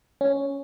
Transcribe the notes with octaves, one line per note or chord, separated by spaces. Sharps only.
C#4